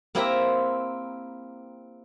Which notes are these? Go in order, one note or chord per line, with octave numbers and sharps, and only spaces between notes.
A#3 C4 E4 G4 E5 A#5